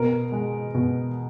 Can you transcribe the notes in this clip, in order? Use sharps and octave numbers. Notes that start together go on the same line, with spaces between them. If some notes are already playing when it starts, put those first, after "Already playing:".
Already playing: B2 A#4
G#3
B2